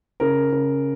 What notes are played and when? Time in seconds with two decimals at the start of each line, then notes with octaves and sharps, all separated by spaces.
0.20 C#3 A#4
0.52 C#3